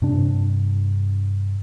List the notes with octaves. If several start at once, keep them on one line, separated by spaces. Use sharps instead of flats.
G2 C3 D4